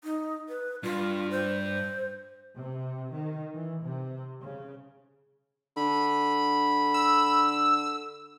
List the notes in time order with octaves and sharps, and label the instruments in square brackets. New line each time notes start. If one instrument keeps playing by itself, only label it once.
[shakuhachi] D#4
B4
[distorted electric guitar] G2 [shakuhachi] F4
[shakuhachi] C5
[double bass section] C3
D#3
E3
C3
C#3
[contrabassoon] D3 [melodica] B5
[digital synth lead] E6